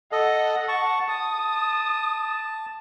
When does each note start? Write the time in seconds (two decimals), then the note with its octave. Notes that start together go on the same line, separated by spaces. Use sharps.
0.12 A4 D#5 F#5
0.68 A5 C#6
1.09 A5 D#6